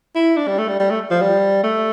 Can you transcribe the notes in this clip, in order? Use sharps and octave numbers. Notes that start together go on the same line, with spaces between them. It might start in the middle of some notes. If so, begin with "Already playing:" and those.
E4
D4
G3
A3
G3
G3
A3
F3
G3
A3